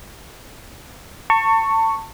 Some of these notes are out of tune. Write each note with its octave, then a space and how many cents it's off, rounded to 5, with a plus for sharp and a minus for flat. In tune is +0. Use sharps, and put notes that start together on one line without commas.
A5 +30 C#6 +0